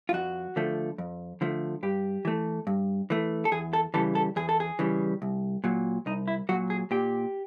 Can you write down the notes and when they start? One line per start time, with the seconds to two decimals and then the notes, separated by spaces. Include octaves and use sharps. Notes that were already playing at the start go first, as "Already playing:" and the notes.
0.09 F4
0.13 F2 F#4
0.56 D3 F3 A3
0.98 F2
1.41 D3 F3 A3
1.83 G2 G4
2.25 E3 A3
2.67 G2
3.10 E3 A3
3.45 A4
3.52 E2 G#4
3.73 A4
3.94 C#3 E3 G3 A4
4.15 A4
4.36 E2 G#4
4.49 A4
4.60 G#4
4.79 C#3 E3 G3
5.22 C2
5.64 A#2 F#3
6.06 C2 D#4
6.28 E4
6.49 A#2 F#3 F#4
6.70 G#4
6.91 A#2 G4